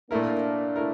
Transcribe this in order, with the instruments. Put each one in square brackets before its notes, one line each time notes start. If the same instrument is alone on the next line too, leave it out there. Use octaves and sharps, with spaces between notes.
[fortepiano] A#2 A3 E4 A#4 [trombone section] A#3 D4
[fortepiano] A3 E4 A#4